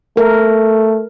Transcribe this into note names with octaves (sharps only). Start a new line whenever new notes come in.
A3 A#4